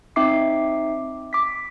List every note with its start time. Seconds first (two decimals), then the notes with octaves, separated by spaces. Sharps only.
0.16 C4 D#4 E5 D6 C7
1.33 D6 B6